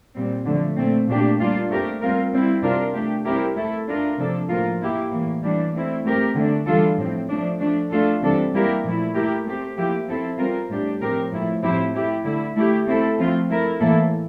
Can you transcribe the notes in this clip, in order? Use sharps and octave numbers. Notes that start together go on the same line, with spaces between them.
A#2 G3 C4
D3 F3 A3
A#2 A3 C4
A#2 A3 D4 G4
G3 A#3 D4 F4
A3 C4 G4 A#4
G3 C4 F4 A#4
G3 C4 E4
C3 G3 D4 F4 A#4
A3 D4 G4
G3 C4 E4 G4 A#4
A3 E4 A4
A3 D4 F4 A#4
C3 F3 A#3 D4 A4
A2 F3 A#3 F4 A#4
F3 A#3 E4 G4
A2 E3 A#3
E3 G3 D4
A3 C4 E4
A3 C4 G4 A#4
D3 A3 D4
E3 G3 D4 F4 A4
A2 F3 C4
F3 A3 D4
F3 A3 D4
A3 D4 F4 A4
C3 E3 G3 D4 A4
G3 A#3 E4 G4 A#4
A#2 F3 A3 E4
A3 E4 G4 A#4
A3 C4 G4
F3 A#3 E4 G4
F3 C4 E4 A4
G3 C4 F4 A#4
A2 G3 D4 G4
A2 F3 C4 G4 A#4
A2 F3 A3 E4
A2 F3 C4 E4 G4
A3 E4 G4
D3 A3 E4
A3 E4 G4
A3 C4 E4 A4
F3 A3 C4 F4
A3 E4 A#4
A2 E3 A#3 E4 A4